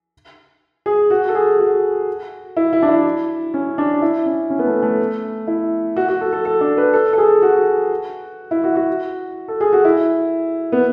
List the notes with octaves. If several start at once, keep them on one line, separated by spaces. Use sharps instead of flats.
G#4
F#4
A4
G#4
F#4
E4
E4
D4
E4
C#4
D4
E4
C#4
C#4
B3
A3
A3
E4
F#4
F#4
A4
A4
A4
D4
B4
A4
A4
G#4
F#4
E4
F#4
F#4
A4
G#4
F#4
E4
B3